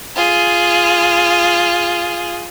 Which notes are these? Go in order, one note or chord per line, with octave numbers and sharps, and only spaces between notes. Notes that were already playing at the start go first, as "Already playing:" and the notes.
F4 G#4